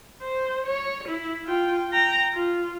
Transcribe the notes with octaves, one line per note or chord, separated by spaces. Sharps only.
C5
C#5
E4
F4 G5
G5 A#5
F4